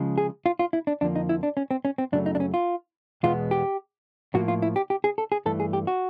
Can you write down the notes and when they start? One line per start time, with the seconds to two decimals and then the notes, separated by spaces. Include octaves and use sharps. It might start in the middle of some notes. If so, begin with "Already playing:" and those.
Already playing: C#3 F3 G#3
0.18 G#4
0.46 F4
0.59 F4
0.73 E4
0.87 D4
1.01 F2 D3 F3 A#3 D4
1.16 D#4
1.29 E4
1.43 D4
1.57 C#4
1.71 C4
1.85 C#4
1.98 C4
2.12 F#2 C#3 F#3 A3 D4
2.26 D#4
2.35 D4
2.40 C#4
2.54 F4
3.23 E2 B2 G#3 B3 F4
3.51 G4
4.35 A2 F3 A#3 F#4
4.48 F4
4.62 E4
4.76 G4
4.90 G4
5.04 G#4
5.18 A4
5.32 G#4
5.46 G2 E3 A3 A4
5.60 G#4
5.73 G4
5.87 F#4